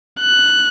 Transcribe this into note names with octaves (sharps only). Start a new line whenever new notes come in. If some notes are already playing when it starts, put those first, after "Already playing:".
F#6